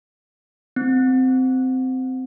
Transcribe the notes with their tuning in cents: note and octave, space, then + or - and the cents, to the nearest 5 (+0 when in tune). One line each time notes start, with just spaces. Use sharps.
C4 -15